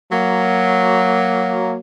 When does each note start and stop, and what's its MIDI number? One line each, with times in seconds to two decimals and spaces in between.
0.12 1.76 54
0.12 1.76 58